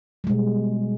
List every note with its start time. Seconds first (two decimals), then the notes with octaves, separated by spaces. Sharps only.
0.24 G3
0.27 G#3
0.30 B2